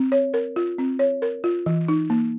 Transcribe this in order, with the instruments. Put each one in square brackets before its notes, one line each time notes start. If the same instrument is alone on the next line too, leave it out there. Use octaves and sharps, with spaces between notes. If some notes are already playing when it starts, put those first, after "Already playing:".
Already playing: [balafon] C4
C#5
A#4
F4
C4
C#5
A#4
F4
E3
D#4
A#3